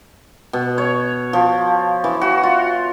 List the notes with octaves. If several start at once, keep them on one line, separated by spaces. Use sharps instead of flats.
B2
C#5
F3
E3
F#4
F4